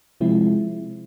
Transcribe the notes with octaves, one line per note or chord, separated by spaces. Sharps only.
C3 F3 G#3 C4 E4